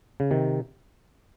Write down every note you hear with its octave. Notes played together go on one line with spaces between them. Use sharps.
C#3
C3 D#3